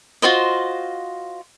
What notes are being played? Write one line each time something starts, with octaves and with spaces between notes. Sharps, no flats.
F4 F#4 C5 D#5